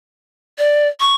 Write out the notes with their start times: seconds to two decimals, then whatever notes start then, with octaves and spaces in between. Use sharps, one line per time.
0.58 D5
1.00 C#6